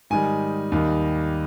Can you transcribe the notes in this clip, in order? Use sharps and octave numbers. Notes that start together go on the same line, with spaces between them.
G#2 D#3 G3 G#5
D#2 D#3 G3